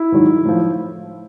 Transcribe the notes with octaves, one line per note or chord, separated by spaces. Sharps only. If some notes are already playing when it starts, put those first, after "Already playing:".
Already playing: E4
G#2 D#3 F#3
A2 F3